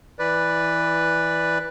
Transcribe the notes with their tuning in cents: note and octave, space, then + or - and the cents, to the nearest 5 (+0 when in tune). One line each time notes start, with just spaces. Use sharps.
E3 -5 B4 +0 D5 +0